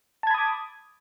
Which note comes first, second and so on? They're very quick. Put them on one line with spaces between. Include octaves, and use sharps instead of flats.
A5 G#6 B5 D#6 D6